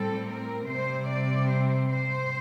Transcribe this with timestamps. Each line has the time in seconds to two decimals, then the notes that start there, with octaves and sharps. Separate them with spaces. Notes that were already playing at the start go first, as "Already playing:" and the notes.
Already playing: A2 G3 C4 A4
0.30 A#4
0.69 C3 G3 C4 C5
1.09 D5
1.49 C5
1.88 C5